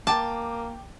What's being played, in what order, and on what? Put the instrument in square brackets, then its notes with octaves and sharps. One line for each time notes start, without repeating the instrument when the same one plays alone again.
[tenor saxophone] A#3 [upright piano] G5 D6 [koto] A5